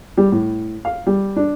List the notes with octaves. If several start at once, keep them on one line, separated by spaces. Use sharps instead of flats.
G3
A2
F5
G3
D4